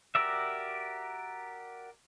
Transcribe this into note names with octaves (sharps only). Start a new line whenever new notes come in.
F#4 G4 A#4 D5 E5